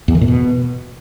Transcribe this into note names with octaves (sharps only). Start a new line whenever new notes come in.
E2
D#3
A#2
B2